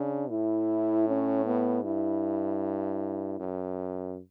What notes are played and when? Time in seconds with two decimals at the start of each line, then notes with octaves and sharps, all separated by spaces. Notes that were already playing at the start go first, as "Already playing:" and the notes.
Already playing: C#3 D4
0.30 A2 E4
1.08 C#4
1.46 B3
1.84 G2 E4
3.39 F#2